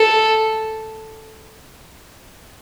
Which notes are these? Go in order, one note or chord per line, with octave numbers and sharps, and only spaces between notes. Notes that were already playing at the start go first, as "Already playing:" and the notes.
Already playing: A4